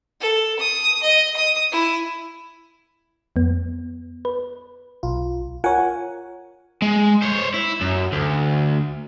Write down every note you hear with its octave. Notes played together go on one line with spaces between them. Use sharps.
A4
D#6
D#5
D#6
E4
F2 B3
B4
B1 F4
F4 A#4 C#5 F#5 G#5
G#3
C5 C#5
E4
F#2
D2